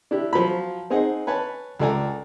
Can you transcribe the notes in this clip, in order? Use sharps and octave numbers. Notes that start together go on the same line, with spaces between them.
D4 E4 G4
F3 F#3 F4 B5
C4 D#4 G#4 D#5 F#5
B4 C#5 G#5 A5
C#2 A4 D5 G#5 A#5